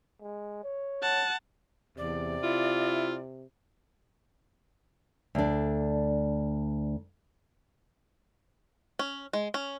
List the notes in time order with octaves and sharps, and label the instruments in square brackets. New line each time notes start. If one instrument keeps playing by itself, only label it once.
[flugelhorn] G#3
C#5
[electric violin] F#5 A5
[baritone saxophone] E2 [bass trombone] C3 [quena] D5
[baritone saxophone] E4 [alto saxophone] F4
[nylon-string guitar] D2 D4
[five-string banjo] C#4
G#3
C#4